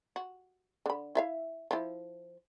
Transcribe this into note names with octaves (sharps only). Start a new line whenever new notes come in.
F#4
D3 B5
E4 E5 F5
F3 E4